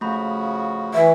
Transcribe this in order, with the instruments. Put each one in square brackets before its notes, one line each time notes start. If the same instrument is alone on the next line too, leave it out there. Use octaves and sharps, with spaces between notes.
[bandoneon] C#3 F3 F#4 [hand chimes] A3 B5
[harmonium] E3 [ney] E5